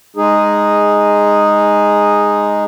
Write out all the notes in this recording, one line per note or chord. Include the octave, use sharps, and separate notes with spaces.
G#3 D#4 G#4